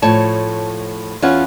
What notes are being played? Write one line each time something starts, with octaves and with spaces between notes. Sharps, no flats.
A2 F3 C#5 A5
E2 C#4 F4 C#5 F#5